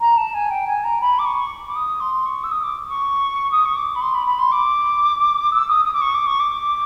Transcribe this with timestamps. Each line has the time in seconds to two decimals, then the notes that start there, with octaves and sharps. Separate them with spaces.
0.01 A#5
0.17 A5
0.34 G#5
0.50 G5
0.67 G#5
0.84 A#5
1.01 B5
1.19 D6
1.25 C#6
1.68 D6
1.75 D#6
2.00 C6
2.25 C#6
2.43 E6
2.51 D#6
2.63 D6
2.89 C#6
3.51 D#6
3.65 C#6
3.76 D6
3.95 B5
4.01 C6
4.14 B5
4.26 B5
4.38 C6
4.51 D6
5.52 E6
5.68 D#6
5.85 D#6
5.94 D6
6.01 C#6
6.14 D6
6.26 C#6
6.39 D6